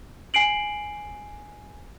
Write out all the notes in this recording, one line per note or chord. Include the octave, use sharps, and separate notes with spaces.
G#5 C7 D7 F#7